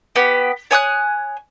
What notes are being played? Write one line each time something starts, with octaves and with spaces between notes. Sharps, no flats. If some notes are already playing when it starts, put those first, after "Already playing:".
B3 G4
C#5 G#5 D#6 F#6